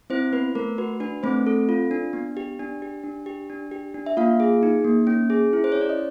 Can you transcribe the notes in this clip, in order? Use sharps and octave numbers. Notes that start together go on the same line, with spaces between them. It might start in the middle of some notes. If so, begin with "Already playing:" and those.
C4 E4 C5
B3 B4
A3 A#4
F#4 B4
D4 B4
A3 C4 C5
A4
F4
D4
B3
G4
D4
G4
D4
G4
D4
G4
D4
E5
A#3 F4 F5
G#4
D#4
A#3
C#4
G#4
E4
C5
C#4 C#5
D5
D#5